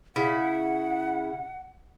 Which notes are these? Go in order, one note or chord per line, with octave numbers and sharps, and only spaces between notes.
C#3 E4 F#5